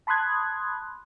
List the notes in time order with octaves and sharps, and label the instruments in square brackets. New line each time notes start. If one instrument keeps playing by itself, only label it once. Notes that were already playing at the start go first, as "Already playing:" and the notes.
[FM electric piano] A5 B5 C6 D#6 F#6 G#6